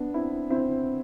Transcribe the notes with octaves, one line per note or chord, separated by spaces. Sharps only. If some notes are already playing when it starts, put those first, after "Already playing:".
Already playing: B3 D4
C4 E4
C4 E4